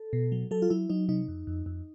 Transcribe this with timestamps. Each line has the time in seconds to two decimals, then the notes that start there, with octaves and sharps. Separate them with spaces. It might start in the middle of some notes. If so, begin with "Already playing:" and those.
Already playing: A4
0.13 B2
0.32 F#3
0.51 F#3 A4
0.62 F4
0.70 F#3 E4
0.90 F#3 D#4
1.09 C3 D#4
1.28 F2
1.47 F2
1.66 F2